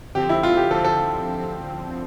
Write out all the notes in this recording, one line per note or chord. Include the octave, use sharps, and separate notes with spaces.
D3 F3 C4 G4
E4
F4
G4
D3 F3 C4 A4
A4